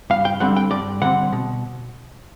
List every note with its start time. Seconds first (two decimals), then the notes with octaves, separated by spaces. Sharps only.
0.10 G2 F5
0.25 G5
0.40 D3 G3 C4 F#5
0.56 G5
0.71 G2 D5
1.02 D3 G3 C4 F#5
1.33 B2